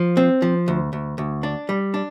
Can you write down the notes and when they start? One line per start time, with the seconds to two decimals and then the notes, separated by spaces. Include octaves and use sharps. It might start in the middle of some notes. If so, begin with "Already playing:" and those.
Already playing: F3
0.17 C4
0.42 F3
0.68 D2
0.93 D2
1.18 D2
1.43 D4
1.69 G3
1.94 D4